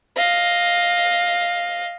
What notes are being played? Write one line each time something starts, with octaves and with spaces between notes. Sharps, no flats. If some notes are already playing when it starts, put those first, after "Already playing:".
D#5 F5